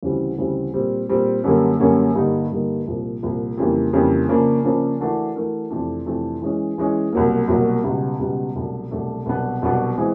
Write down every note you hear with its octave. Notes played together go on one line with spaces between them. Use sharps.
D2 C#3 E3 G3 C4
D2 C#3 E3 G3 C4
A#2 G3 C4
A#2 G3 C4
F#2 D3 G3 A#3 C#4
F#2 D3 G3 A#3 C#4
G2 D3 G3 A#3 D#4
G2 D3 G3 A#3 D#4
C2 A#2 F3
C2 A#2 F3
F2 C#3 E3 G3 A#3
F2 C#3 E3 G3 A#3
C#3 F3 A#3 D4
C#3 F3 A#3 D4
E3 A3 D4 F#4 A#4
E3 A3 D4 F#4 A#4
F2 C3 E3 A3 D4
F2 C3 E3 A3 D4
E3 G#3 C#4
E3 G#3 C#4
C2 B2 F#3 A#3
C2 B2 F#3 A#3
C#2 B2 G3 B3
C#2 B2 G3 B3
C2 B2 F#3 A3 D4
C2 B2 F#3 A3 D4
C2 B2 F#3 B3 D4
C2 B2 F#3 B3 D4
E3 G#3 C4